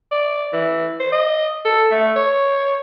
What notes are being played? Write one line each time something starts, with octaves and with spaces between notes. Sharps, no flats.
D5
E3
C5
D#5
A4
A3
C#5